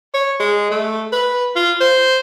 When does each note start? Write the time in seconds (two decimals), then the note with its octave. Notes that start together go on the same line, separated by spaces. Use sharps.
0.14 C#5
0.40 G#3
0.71 A3
1.12 B4
1.56 F4
1.80 C5